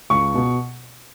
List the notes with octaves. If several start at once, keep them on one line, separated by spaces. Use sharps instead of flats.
C#2 C#6
B2